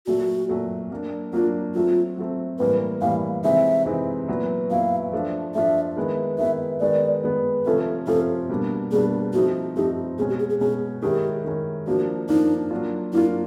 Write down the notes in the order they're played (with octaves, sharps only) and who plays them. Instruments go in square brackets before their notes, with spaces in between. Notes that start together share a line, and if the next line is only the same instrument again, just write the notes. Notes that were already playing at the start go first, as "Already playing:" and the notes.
[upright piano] A#2 F#3 A3 [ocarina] F#4
[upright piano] A#2 F#3 A3
F#3 A#3 D4
[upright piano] F#3 A#3 D4 [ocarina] F4
[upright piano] F#3 A3 C4 [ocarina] F4
[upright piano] F#3 A3 C4
[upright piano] A2 E3 G3 A#3 [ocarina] B4
[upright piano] A2 E3 G3 A#3 [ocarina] F5
[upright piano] C3 E3 G#3 C4 D#4 [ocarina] E5
[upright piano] C3 E3 G#3 C4 D#4
A#2 F#3 B3 E4
[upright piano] A#2 F#3 B3 E4 [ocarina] F5
[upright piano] F3 A3 D4 F4
[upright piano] F3 A3 D4 F4 [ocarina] E5
[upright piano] D#3 G#3 B3 E4
[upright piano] D#3 G#3 B3 E4 [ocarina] E5
[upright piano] D#3 G#3 B3 [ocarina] D5
[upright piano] D#3 G#3 B3
[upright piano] C3 F3 A3 C#4 F4 [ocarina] A4
[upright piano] C3 F3 A3 C#4 F4 [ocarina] A4
[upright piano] B2 G3 A#3 D4
[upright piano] B2 G3 A#3 D4 [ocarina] G#4
[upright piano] F3 A3 C4 D#4 [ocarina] F#4
[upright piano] F3 A3 C4 D#4 [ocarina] G4
[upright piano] B2 G#3 C#4 [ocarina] G#4
[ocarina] G4
G#4
G#4
[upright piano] B2 G#3 C#4 [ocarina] G#4
[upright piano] D#3 G#3 C#4 E4 [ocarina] G4
[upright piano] D#3 G#3 C#4 E4
[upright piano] F3 A#3 D4 [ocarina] F#4
[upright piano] F3 A#3 D4 [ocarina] D#4
[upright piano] F#3 A#3 D4 F4
[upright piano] F#3 A#3 D4 F4 [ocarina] E4